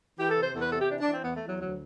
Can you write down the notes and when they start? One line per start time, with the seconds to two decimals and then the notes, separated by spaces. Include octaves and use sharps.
0.18 E3 G4
0.29 A4
0.35 C3
0.41 C5
0.53 E2 A4
0.62 B4
0.71 C3 A4
0.80 G4
0.88 E3 D4
1.00 D4
1.07 E3 C4
1.24 E2 B3
1.36 A3
1.42 E2
1.48 F#3
1.60 D2 F#3